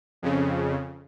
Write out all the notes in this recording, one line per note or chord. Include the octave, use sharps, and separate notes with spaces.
F2 C#3